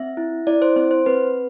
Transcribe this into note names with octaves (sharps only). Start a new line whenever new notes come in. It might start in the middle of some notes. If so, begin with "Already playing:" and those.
Already playing: C4 E5
E4
E4 D5
C5
C4 C5
C5
C4 B4